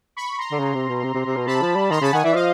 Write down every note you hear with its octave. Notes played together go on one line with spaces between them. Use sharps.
B5 C#6
A#5 C6
D3
C#3
C3
B2
C3
C3
C3
B2
C3 A5 B5
F3
G3
D#3 A#5 C6
C#3 A5 B5
D#3 F#5 G#5
E3 D5 E5
F3 D#5 F5